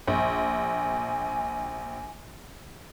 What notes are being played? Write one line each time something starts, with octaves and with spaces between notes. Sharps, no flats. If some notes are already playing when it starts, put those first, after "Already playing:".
A#1 G#5